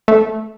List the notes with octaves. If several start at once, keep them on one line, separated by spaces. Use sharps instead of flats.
A3